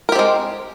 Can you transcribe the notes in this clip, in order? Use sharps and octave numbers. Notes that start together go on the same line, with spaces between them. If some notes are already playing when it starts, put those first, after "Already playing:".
G#3 C4 G4 A#4